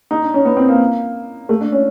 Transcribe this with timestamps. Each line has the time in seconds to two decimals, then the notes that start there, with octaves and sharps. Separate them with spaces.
0.11 D#4
0.22 D4
0.34 C#4
0.45 B3
0.57 C4
0.68 A#3
1.49 A3
1.61 D4
1.72 C#4